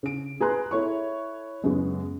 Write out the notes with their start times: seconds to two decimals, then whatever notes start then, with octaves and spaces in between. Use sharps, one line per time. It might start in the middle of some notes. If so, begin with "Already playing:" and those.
0.03 C#3 D7
0.40 G#4 B4 A#5 C6 F#6
0.71 E4 A4 C#5 C#6
1.64 F#2 C#3 G#3 B3